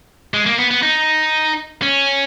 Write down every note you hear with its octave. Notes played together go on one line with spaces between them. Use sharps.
G#3
A#3
B3
B3
D#4
C#4